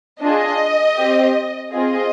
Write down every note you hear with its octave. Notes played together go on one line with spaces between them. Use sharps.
D4 F4 G#4 D#5
C4 G4
C4 F4 G#4 D#5